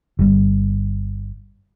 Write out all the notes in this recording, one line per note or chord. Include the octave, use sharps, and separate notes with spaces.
G1 G3